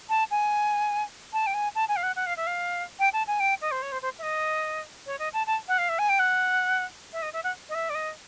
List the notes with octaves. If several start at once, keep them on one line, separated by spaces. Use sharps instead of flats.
A5
G#5
A5
G5
G#5
A5
G#5
F5
F#5
F#5
F5
E5
F5
G5
A5
G#5
G5
D#5
C5
C#5
C5
C5
E5
D#5
C#5
D#5
A5
A5
F#5
F5
E5
G#5
G5
F#5
E5
D#5
E5
F#5
D#5
E5
D5
D#5